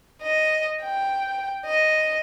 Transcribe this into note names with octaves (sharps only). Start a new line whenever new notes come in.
D#5
G5
D#5